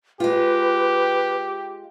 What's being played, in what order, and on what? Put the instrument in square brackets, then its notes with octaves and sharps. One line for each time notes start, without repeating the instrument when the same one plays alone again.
[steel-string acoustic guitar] G#3 F4 [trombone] G4 [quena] B4